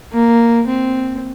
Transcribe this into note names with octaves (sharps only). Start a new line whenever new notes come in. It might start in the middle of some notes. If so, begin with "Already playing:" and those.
A#3
C4